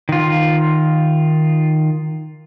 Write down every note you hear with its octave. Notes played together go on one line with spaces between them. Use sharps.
D#3 F4